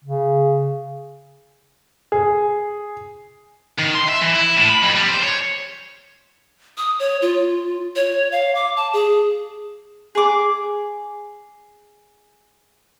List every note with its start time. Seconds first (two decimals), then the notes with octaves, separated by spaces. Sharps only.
0.05 C#3
2.12 G#4
3.79 D#3
3.95 C6
4.09 E5
4.22 E3
4.34 E4
4.57 A2
4.70 B5
4.83 F2
4.96 G3
5.10 C5
5.24 C#5
6.77 D#6
6.99 C#5
7.22 F4
7.96 C#5
8.32 F5
8.55 D6
8.77 A5
8.93 G#4
10.15 G#4 D6